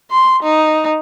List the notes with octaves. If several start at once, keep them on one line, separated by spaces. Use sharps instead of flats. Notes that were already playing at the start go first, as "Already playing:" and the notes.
C6
D#4